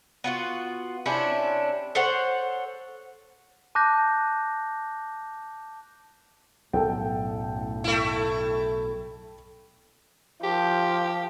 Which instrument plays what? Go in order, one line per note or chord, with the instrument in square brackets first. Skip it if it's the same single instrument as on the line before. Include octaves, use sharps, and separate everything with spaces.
[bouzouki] B3 F4 F#4
C3 C#4 D4 E4
A4 C5 C#5 F#5
[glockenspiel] A5 D6 F#6 G6 A#6
[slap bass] B1 [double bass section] F#2 A2 [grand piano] A4 G5
[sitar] A3 E4
[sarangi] F3 [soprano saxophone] G4